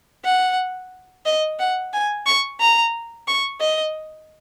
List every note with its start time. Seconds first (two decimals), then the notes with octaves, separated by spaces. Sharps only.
0.24 F#5
1.26 D#5
1.59 F#5
1.93 G#5
2.26 C#6
2.60 A#5
3.28 C#6
3.60 D#5